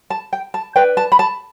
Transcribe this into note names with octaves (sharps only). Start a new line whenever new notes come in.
A5
G5
A5
D4 B4 G5
A5
B5
A5